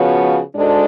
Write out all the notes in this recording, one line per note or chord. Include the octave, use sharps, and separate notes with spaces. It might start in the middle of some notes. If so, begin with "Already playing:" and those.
Already playing: C#3 F3 B3 F#4 C#5
G#2 G#3 D4 F#4 A4